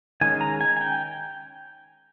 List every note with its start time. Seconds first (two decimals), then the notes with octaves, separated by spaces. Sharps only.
0.21 D#3 G#3 C#4 G#5
0.41 A#5
0.61 G#5
0.77 G#5
0.81 G5